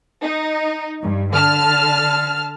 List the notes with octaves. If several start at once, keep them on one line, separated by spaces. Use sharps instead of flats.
D#4
G2
D3 A5 F6